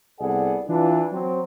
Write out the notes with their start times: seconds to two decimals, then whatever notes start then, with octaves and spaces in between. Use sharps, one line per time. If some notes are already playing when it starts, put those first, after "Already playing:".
0.20 C2 B3 G#4 A4 D5 F#5
0.68 E3 D4 F4
1.12 F#3 C4